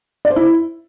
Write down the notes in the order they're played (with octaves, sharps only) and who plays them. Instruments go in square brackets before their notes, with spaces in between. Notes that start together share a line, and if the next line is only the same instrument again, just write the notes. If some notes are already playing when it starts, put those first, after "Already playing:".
[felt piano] D5
C5
E4